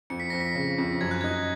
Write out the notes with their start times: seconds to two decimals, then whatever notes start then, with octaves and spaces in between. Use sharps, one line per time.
0.10 F2 C#7
0.20 B6
0.30 F2 A#6
0.40 B6
0.55 C#3
0.78 F2
1.01 F#2 G#6
1.11 F#6
1.21 G#6
1.24 D#4